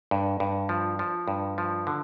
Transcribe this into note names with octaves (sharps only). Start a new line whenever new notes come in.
G2
G2
F3
F3
G2
F3
D3